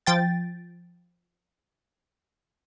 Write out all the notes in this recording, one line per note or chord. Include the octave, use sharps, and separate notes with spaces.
F3 G5 A6